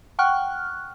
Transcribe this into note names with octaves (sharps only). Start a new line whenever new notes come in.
F#5 G5 C#6 F6 F#6